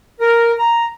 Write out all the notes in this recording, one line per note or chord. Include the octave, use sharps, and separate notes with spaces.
A#4
A#5